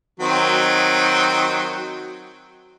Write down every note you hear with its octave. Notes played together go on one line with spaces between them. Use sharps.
D#3 F#3 C4